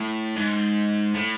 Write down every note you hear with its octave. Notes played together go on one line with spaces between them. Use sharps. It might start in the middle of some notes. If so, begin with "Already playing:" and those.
Already playing: A2
G#2
A2